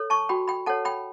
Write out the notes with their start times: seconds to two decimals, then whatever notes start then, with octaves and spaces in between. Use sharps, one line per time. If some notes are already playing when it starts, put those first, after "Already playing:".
Already playing: A4 C#5
0.10 A5 C#6
0.29 F#4 G5 B5
0.48 G5 B5
0.66 A4 C#5 F#5 A5
0.85 G5 B5